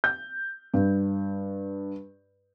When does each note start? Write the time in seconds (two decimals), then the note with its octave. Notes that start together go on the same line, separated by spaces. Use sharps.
0.04 G6
0.74 G2